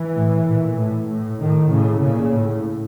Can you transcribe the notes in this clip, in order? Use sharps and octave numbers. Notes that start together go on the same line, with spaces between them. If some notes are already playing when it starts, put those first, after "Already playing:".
Already playing: E3
A2
A#2
A2
A2
A2 D#3
A2 C#3
A#2 C#3
A2